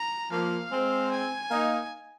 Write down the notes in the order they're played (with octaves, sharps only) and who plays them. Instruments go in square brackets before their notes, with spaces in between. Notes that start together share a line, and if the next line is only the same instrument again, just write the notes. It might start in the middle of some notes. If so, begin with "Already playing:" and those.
Already playing: [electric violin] A#5
[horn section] F3 A#3 [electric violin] F5
[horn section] G#3 C4
[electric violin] G#5
[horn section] A#3 D#4